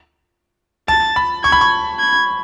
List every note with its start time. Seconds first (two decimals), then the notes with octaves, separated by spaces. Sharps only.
0.88 A5 A6
1.16 B5
1.43 C#6 G#6
1.52 B5
1.61 C#6
1.99 G#6